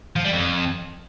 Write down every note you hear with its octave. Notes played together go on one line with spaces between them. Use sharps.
F3
G3
F2